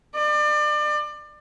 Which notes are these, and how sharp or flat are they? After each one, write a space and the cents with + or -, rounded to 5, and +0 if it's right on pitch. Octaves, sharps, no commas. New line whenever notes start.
D5 +30